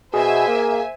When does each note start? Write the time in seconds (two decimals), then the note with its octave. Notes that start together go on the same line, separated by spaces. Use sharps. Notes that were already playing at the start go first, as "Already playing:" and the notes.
0.14 B2 G#4 C5 E5 G#5
0.48 A#3